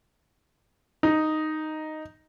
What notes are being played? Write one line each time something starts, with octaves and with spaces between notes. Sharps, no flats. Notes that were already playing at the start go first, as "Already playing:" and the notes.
D#4